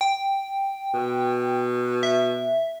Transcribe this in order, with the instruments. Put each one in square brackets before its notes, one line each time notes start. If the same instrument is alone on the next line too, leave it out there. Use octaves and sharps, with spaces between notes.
[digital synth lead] G5
[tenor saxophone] B2
[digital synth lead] E5